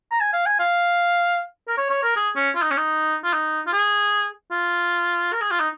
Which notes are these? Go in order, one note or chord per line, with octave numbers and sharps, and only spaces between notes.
A#5
G#5
F5
G#5
F5
A#4
C#5
C#5
A#4
G#4
C#4
F4
D#4
C#4
D#4
F4
D#4
F4
G#4
F4
A#4
G#4
F4
D#4